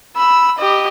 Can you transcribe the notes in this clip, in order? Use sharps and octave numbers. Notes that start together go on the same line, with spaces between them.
B5 E6
G4 D#5